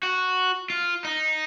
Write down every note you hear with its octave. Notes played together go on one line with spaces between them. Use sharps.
F#4
F4
D#4